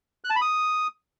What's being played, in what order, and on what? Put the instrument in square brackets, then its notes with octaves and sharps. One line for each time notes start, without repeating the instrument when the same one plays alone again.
[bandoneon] F#6
A5
B5
D#6